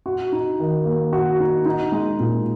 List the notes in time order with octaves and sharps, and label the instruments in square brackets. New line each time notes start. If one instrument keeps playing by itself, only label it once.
[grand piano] F#4
D#4
D#3
A#3
F#4
D#4
D#4
G#3
A#2